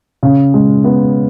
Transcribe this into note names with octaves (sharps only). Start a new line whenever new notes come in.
C#3
G#3
B3